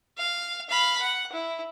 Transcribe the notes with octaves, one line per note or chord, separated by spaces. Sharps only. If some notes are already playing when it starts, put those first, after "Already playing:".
F5
F5 B5
F#5
E4